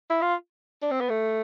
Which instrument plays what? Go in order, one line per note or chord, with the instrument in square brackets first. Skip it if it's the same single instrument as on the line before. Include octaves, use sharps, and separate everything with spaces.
[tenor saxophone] E4
F4
D4
C4
B3
A3